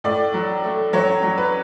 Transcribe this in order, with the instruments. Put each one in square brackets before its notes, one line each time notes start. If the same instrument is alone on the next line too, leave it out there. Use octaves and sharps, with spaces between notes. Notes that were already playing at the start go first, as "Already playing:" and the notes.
[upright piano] A2 D5
F#3
A3
F#3 C#5
F#3
B4